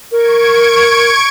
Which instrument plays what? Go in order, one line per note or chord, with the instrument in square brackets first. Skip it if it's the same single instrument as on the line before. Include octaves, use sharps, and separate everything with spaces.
[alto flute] A#4 [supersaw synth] C#6 G#6 D7